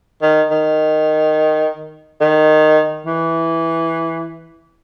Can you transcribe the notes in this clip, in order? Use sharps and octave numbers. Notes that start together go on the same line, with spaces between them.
D#3
D#3
D#3
E3